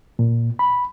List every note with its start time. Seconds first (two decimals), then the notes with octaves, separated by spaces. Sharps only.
0.19 A#2
0.59 B5